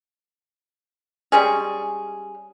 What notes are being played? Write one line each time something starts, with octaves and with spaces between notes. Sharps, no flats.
G3 G#3 C#4 G#4